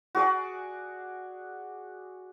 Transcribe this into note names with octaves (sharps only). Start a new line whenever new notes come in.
F#4 G#4 D5